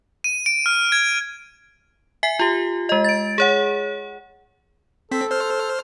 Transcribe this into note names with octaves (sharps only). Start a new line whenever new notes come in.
D#7
D7
F6
G#6
E5 G#5 B6 C7
F4 G4
G#3 D#5
A6 D7
G#4 C#5 F#5
C4 A4 B6
C5 F6